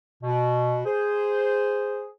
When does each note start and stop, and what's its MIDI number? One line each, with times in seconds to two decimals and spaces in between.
0.22 0.80 47
0.85 2.08 68
0.85 2.08 72